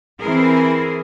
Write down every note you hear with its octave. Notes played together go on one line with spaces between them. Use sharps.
E3 C4 E4 G#4 A#4